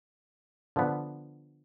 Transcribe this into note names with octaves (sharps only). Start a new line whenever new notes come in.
D3 F3 B3